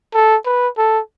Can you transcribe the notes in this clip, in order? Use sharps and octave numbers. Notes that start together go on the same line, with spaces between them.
A4
B4
A4